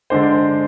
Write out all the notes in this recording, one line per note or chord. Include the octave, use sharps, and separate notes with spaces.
D3 G#3 D4 C5
D5
C5